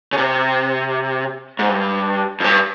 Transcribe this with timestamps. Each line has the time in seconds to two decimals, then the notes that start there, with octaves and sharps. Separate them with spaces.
0.13 C#3
0.17 C3
1.59 G#2
1.69 G2
2.40 F2
2.44 G2